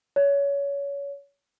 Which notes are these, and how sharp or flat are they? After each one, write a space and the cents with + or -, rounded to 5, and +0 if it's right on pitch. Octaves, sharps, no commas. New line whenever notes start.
C#5 +25